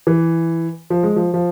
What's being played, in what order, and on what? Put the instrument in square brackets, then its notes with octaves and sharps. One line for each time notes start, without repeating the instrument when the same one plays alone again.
[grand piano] E3
F3
G#3
F3
F3